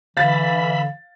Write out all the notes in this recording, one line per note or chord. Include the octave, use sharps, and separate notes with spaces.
D3 E3 E5 F5 B5 A6